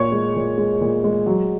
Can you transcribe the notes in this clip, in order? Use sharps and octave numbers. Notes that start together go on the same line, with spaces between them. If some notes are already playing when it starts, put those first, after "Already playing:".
Already playing: A#2 C#5 C#6
G#3
A#2
G#3
A#2
G#3
F#3